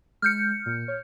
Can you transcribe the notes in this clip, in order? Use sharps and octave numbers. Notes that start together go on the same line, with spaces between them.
G#3 F6 G6 C#7
A#2
C#5